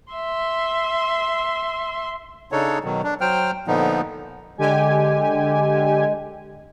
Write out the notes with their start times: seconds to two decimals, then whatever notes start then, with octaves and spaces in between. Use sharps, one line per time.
0.12 E5 C6
2.52 C#3 D4 D#4 A4 C#5
2.84 B2 D#3 F#3
3.03 D4
3.21 F#3 C5 G5 F6
3.67 A#2 D3 F3 B3 D#4
4.58 D3 G#3 G4 G#5